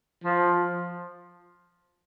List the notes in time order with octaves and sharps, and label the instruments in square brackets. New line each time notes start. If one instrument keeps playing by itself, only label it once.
[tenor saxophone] F3